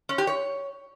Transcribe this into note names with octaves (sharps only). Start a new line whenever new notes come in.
C#4
G4
C#5